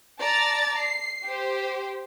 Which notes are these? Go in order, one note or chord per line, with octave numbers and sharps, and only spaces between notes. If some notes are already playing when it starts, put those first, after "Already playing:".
D5 A5 A#5 A6
C7
G4 C5